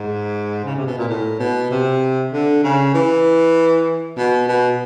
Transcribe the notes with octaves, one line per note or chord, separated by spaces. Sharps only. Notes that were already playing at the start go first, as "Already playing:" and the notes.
Already playing: G#2
C#3
C3
B2
A#2
A2
B2
C3
D3
C#3
E3
B2
B2